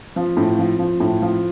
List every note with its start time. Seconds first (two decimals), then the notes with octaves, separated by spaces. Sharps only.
0.16 F3
0.37 A2
0.59 F3
0.79 F3
1.00 A2
1.22 F3